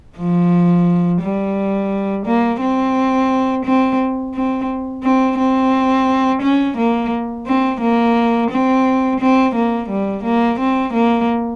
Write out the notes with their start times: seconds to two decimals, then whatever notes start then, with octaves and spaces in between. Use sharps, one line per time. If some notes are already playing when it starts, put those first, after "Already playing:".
0.18 F3
1.21 G3
2.26 A#3
2.61 C4
3.65 C4
4.34 C4
5.03 C4
5.38 C4
6.42 C#4
6.78 A#3
7.46 C4
7.81 A#3
8.51 C4
9.20 C4
9.55 A#3
9.89 G3
10.24 A#3
10.60 C4
10.94 A#3